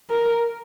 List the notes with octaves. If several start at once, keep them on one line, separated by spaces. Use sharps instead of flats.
A#4